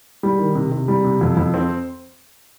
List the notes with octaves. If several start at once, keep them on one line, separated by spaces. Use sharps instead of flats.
G3
D#3
C3
C3
G3
C3
F2
F2
C4